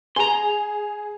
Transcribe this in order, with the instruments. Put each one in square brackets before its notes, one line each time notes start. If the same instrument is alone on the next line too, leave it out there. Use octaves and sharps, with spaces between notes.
[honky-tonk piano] G#4 [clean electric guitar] A#5 C6